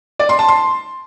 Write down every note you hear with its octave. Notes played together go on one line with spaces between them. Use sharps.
D5
C6
A5
C6